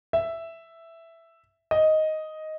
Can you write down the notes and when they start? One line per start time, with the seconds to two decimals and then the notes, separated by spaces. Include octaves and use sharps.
0.13 E5
1.71 D#5